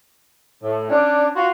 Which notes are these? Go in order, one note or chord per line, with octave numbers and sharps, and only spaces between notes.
A2
C#4 D4
F4 F#4